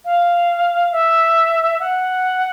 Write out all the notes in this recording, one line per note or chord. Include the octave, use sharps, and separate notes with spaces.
F5
E5
F#5